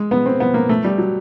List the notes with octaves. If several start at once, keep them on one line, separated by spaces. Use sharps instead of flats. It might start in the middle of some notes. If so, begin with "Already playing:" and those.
Already playing: G#3
B3
C4
B3
A#3
A3
G3
F#3